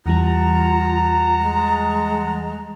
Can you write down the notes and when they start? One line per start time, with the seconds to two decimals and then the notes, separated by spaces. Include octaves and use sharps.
0.06 E2 E3 G3 F4 F#5 A5 A#5
1.40 G#3